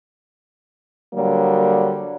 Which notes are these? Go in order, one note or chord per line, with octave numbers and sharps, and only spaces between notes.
D3 F#3 G3 A#3